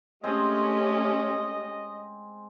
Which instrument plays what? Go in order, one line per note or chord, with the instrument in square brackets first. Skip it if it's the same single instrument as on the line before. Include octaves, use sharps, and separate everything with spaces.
[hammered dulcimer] G#3 C4 [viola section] A3 C#4 G4 [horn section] D#5